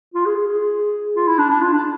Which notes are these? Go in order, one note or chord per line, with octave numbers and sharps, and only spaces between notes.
F4
G#4
G#4
G#4
F4
E4
D4
D4
F4
D4